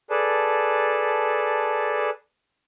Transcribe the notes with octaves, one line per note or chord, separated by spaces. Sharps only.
G#4 A4 B4 D5 A5